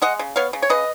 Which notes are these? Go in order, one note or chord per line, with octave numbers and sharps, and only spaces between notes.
G#3 D#5 F#5
C#3
B3 C#5 F5
C#3
C#5
C#3 B4 D#5